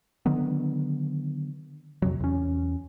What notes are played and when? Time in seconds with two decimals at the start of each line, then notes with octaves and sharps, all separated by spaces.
0.26 D3 D#3 F#3 B3
2.02 F2 C3 F#3
2.20 E2 C#4